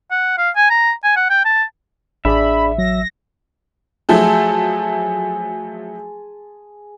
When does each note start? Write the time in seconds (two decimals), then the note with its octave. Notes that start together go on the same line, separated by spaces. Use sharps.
0.11 F#5
0.38 F5
0.56 G#5
0.70 A#5
1.04 G#5
1.17 F#5
1.30 G5
1.45 A5
2.25 A1 D4 G#4 D5 E5 B5
2.78 F#3 A#6
4.09 F3 F#3 A3 G#4 A5 C6